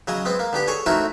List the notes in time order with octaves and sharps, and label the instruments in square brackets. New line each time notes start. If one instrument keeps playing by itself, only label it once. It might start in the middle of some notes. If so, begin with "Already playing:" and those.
[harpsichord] C#3 F#3 D#5 G#5 D#6
G#3 B3 C4
A#3
D3 B3 G4
G#4 A4 C#5 G#5
A3 C4 D#4 E4 F#4 A#4